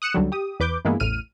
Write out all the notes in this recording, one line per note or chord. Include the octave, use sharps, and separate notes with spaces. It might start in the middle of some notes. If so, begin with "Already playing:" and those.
D#6 F#6 C#7 E7
C#2 D3 F#3 G3
G4 D#6
E2 B4 D6 G6
G2 E3 G#3 A#3 B3 E4
A1 E2 A2 F6 D#7